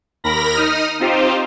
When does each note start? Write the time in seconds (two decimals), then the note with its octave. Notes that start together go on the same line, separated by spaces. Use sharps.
0.24 D#2 A#4 B5 A#6
0.55 D#4 D#6 F6
1.00 C4 D#4 F4 G4 C5